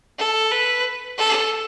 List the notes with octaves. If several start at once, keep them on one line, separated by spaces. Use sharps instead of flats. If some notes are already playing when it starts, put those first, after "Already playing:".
A4
B4
A4